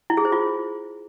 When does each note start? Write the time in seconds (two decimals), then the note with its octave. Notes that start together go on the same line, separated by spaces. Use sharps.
0.10 E4
0.17 G#4
0.25 C5
0.32 F4